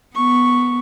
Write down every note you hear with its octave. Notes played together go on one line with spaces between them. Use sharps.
B3 C#6